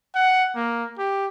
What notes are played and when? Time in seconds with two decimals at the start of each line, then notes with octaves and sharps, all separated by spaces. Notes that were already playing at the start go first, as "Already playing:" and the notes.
0.15 F#5
0.56 A#3
0.98 G4